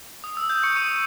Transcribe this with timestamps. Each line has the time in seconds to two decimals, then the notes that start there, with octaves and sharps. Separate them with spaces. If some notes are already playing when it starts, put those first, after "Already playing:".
0.24 D#6
0.37 E6
0.50 G6
0.63 C#6 C#7
0.76 D#6 D#7